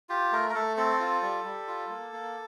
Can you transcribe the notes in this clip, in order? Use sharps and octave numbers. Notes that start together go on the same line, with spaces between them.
F4 G4
A3 A#4
A#4
A3 A4
C4 A4
F4
G3
G3
F4
A#3
A#3